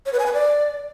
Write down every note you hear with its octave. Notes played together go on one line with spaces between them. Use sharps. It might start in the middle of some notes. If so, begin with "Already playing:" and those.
C#5
B4
G#5
B4
D5